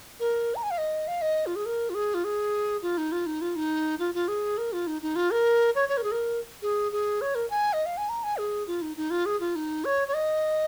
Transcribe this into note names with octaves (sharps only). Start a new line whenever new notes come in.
A#4
A#5
G#5
F5
D#5
F5
D#5
F4
G#4
A#4
F4
G#4
F4
G#4
F4
D#4
F4
D#4
F4
D#4
F4
F4
G#4
A#4
F4
D#4
D#4
F4
A#4
C#5
C#5
A#4
G#4
A#4
G#4
G#4
C#5
A#4
G#5
D#5
F5
G#5
A#5
G#5
G#4
F4
D#4
D#4
F4
G#4
F4
D#4
C#5
C#5
D#5